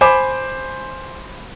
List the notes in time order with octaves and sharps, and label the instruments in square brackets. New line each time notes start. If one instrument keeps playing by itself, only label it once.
[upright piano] C5 G#5 B5 C6 D6